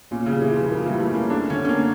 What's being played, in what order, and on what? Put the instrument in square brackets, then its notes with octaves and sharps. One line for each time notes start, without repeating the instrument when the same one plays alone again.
[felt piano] A#2 [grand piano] C#4
[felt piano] C#3 [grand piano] G3
[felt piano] E3
[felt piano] F3 [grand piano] F4
[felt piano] F3 [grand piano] A#3
[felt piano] E3 [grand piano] G3
[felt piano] A3
[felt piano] A#3 [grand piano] C#4
[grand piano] A3 [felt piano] D4
[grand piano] D3 [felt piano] C#4
[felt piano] C#4
[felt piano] A#3 [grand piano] D4